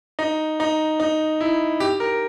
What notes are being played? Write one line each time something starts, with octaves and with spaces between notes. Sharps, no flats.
D#4
D#4
D#4
E4
G4
A#4